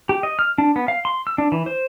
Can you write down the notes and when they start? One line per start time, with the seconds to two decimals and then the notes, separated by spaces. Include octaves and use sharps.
0.09 G4
0.23 D#5
0.39 F6
0.58 D4
0.76 B3
0.88 F5
1.05 C6
1.27 E6
1.38 D4
1.52 E3
1.66 C5